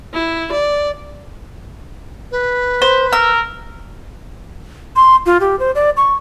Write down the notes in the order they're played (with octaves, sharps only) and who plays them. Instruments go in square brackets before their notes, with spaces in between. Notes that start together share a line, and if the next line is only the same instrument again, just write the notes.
[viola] E4
D5
[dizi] B4
[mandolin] C5
[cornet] A#4 [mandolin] E6
[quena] C6
F4
G4
C5
D5
C#6